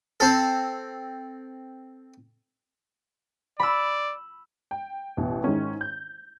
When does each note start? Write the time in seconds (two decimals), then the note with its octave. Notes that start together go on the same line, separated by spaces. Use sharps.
0.20 C4 A4
3.60 D5 B5 E6
4.71 G5
5.17 A1 B2
5.44 G#2 D#3 G#3 C#4
5.81 G6